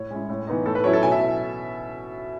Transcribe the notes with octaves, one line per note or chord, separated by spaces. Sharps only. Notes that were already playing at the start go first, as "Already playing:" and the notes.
Already playing: A2 C#5
G#3 C#4 E4
A2
E3 B3 D#4
A2 A4
B4
F#3 C#4 E4 C#5
A4
B2 G#5
E5